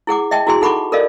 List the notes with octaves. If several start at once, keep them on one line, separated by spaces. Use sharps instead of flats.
E4 G#4 F#5 D6
D#5 E5 G5 A5
E4 F#4 G#4 G#5 C6
D#4 A4 F#5 B5 C#6 D6
A4 A#4 D5 D#5 F5